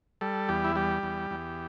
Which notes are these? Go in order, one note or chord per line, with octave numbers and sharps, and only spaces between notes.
G3 A4
E2 G4
E4
G3 G4
E2
E2